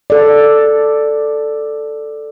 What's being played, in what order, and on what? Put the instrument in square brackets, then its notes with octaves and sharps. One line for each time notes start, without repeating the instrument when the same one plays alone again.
[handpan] A4 D5